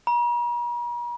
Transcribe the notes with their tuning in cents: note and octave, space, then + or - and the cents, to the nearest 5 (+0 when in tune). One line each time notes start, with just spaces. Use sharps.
A#5 +45